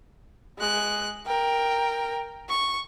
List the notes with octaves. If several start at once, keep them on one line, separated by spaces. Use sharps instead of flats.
G#3 F#6
A#4 G5
C#6